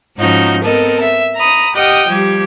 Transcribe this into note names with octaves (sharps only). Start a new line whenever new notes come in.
G#2 F3 C#4 D#4 F#4 G6
B3 C4 A4 A#4 D#5
E5
A#5 B5 D#6
G4 D#5 F#5 G5 D#6 F6
F3 G3 G4 G#6